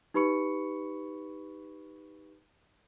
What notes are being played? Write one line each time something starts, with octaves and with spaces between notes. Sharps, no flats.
D#4 G4 B4 B5 C#6 C#7